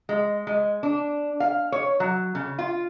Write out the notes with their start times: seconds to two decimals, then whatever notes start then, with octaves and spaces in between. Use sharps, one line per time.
0.09 G#3
0.47 G#3
0.83 D4
1.40 F5
1.72 C#5
2.00 F#3
2.35 C#3
2.59 F4